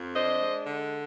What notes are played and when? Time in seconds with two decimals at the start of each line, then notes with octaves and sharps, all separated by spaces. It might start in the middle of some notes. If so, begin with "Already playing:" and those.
Already playing: F2 F3
0.15 D4 C5 D#5
0.41 G#3
0.66 D3